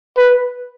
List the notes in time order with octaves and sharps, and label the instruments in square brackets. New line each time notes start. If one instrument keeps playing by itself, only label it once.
[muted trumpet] B4